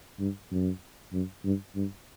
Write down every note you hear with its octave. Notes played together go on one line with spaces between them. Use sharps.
G2
F#2
F#2
G2
G2